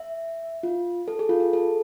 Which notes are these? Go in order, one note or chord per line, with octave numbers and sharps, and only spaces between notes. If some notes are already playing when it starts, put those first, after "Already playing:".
Already playing: E5
F4
A4
G#4
F4
G#4
A4